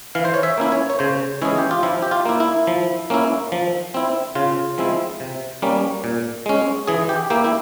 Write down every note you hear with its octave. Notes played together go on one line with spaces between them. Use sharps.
E3 F5
C5
C#5
E5
A#3 C#4 E4
C#5
C#5
C#3 C5
E3 G#3 C#4 E4 G#4
G4
F4
F3 E4
G4
F4
A#3 E4
E4
F3
A#3 C#4 E4
F3
C4 E4
C#3 F4
F3 G#3 C4 E4
C3
G3 A#3 C#4
A#2
G#3 C#4
E3 G#4
G4
A#3 E4 G4
E4